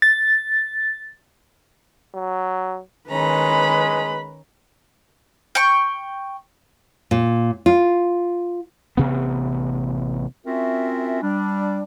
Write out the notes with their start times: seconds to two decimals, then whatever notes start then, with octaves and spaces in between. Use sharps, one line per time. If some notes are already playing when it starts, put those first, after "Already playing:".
0.02 A6
2.15 F#3
3.10 D#3 G#3 C#4 B4 A#5 B5
5.55 G5 C#6
7.11 A#2
7.66 F4
8.97 A1 C3 B3
10.46 C4 C#4 F4 F#4 A#4 E5
11.22 G3 D4